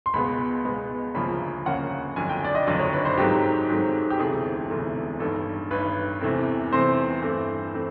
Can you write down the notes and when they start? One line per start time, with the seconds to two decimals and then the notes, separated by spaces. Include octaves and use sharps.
0.06 C6
0.14 C#2 B2 G#3 B3 B5
0.64 C#2 B2 G#3 B3
1.15 D2 C#3 F3 A#3 C#4 B5
1.65 D2 C#3 F3 A#3 C#4 F#5
2.16 F#1 F2 D3 F#3 G#5
2.29 G5
2.44 D5
2.55 D#5
2.67 F#1 F2 D3 F#3 D#5
2.79 C#5
2.93 B4
3.05 C5
3.18 G#2 D#3 F#3 A3 C4 G4
3.69 G#2 D#3 F#3 A3 C4
4.10 G4
4.19 E1 D2 C3 E3 A3 G#4
4.70 E1 D2 C3 E3 A3
5.20 A1 G2 D#3 A4
5.70 A1 G2 D#3 B4
6.21 E2 C3 E3 A3 C4
6.72 E2 C3 E3 A3 C4 C5
7.22 G2 E3 A3 C4
7.73 E3 A3 C4